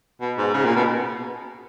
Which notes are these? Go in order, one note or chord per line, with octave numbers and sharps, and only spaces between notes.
B2
G#2
C#3
A#2
B2